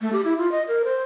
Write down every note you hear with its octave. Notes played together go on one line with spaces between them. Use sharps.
A3
G4
E4
F4
D#5
A#4
C5